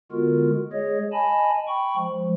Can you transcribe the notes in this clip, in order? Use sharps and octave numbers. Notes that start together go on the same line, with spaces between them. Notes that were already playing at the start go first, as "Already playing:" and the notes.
D3 G#3 B3 F4 F#4 A#4
G#3 G#4 C#5 D#5
D#5 G#5 A5 B5
G5 B5 C#6
F3 G#3